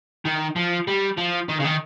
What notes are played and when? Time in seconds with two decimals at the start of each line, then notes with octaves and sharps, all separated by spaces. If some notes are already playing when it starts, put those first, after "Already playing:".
0.25 D#3
0.56 F3
0.87 G3
1.17 F3
1.49 D#3
1.60 C#3
1.65 D#3